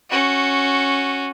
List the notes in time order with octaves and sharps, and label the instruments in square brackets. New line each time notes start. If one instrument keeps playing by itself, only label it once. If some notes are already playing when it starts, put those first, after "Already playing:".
[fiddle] C#4 F#4